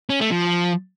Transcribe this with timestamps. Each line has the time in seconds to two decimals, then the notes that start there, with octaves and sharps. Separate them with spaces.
0.10 C#4
0.20 A3
0.31 F3